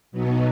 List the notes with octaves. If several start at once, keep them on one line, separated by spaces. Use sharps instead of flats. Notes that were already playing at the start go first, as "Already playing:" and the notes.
B2 F#3 B3 D#4